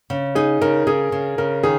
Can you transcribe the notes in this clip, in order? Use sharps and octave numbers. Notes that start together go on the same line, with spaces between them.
C#3
D#4 G#4
C#3 A#4
C#3 G#4
C#3
C#3 A#4
D#3 G#4